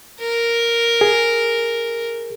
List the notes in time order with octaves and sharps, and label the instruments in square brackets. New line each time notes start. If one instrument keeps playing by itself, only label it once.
[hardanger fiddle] A#4
[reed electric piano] G#4